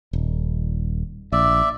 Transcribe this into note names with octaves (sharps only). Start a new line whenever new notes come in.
D#1
A#1 D5 E5